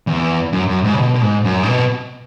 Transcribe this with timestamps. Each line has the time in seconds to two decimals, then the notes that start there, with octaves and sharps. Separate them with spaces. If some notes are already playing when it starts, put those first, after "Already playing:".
0.07 E2
0.53 F#2
0.68 F#2
0.84 G#2
0.94 C#3
0.99 B2
1.14 B2
1.22 G#2
1.44 F#2
1.63 G#2
1.68 B2